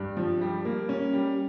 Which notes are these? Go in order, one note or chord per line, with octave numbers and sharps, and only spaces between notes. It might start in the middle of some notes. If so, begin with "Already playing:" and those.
Already playing: G2
F3
G3
A#3
C#4
G3